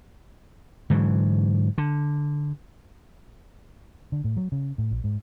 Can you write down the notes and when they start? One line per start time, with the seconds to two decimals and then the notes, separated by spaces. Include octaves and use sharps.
0.90 G#2 D3 E3 F#3
1.78 D3
4.12 D3
4.24 A2
4.37 F#3
4.52 C#3
4.78 A2
4.91 A#1
5.04 G#2